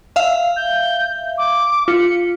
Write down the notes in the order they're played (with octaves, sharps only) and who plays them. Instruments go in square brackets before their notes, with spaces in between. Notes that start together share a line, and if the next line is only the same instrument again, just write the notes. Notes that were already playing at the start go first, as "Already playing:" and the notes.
[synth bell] E5 F5
[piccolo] G6
D6
[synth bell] F4 [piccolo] C#7